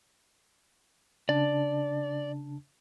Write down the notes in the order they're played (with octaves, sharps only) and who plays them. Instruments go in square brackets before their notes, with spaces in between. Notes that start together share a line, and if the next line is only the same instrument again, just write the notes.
[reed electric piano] C#3 D4 A5 [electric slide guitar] D5